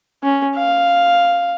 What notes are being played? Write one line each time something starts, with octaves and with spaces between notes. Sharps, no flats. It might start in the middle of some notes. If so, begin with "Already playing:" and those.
C#4
F5